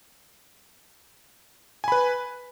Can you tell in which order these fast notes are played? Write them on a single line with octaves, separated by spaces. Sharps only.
G#5 B5 B4